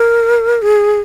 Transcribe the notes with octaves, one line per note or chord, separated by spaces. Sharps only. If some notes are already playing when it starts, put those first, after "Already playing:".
Already playing: A#4
G#4